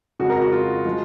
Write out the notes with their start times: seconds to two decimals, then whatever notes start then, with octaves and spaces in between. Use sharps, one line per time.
0.19 F2 C#3 G#3 F#4
0.30 F#4 A#4
0.41 F#4
0.52 F4
0.85 F3 G#3